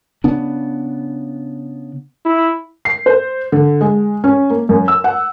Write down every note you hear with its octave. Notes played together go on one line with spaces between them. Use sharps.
C#3 B3 D4
E4
C7
C5
D3
G#3
C#4
A#3
F#2
E6
F#5